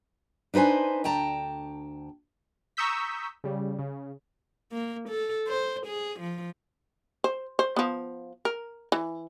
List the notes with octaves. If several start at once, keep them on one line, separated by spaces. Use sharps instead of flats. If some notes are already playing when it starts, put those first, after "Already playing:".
D4 D#4 B4 C5 G#5
D2 G5 A5 A#5
A#5 C#6 D#6 E6 G6 B6
C#3 G3
C#3
A#3
A4
C5
G#4
F3
C5
C5
F3 B3
A#4
E3